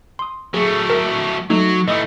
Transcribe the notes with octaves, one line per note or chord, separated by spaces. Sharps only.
C6 D#6
F#3 A3 G#4
A#4
F#3 A3 D#4 A4
E3 A3 D#5 D#6